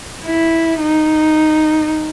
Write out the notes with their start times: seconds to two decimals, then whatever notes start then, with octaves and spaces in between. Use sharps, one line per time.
0.25 E4
0.80 D#4